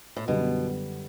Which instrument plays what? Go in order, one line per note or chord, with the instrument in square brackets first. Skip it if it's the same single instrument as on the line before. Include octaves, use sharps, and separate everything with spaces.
[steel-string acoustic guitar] A2
[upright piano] F#2 D3 G3 [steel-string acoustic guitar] B2